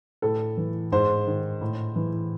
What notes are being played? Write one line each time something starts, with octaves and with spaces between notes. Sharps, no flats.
A2 A4
E3
G#2 C5
D#3
A2
E3